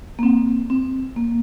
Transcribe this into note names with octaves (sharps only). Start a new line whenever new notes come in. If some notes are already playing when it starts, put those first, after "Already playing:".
A#3
C4
C4
A#3